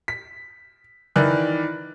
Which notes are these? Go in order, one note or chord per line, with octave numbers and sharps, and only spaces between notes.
B6
D#3 E3 A#4 D5 F#6